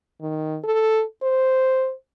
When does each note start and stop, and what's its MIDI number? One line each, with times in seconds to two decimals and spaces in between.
0.21 0.58 51
0.64 1.02 69
1.22 1.92 72